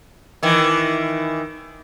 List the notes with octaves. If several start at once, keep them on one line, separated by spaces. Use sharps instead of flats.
D#3 E3